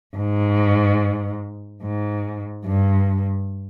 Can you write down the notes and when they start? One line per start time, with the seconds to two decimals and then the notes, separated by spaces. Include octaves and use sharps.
0.17 G#2
1.82 G#2
2.65 G2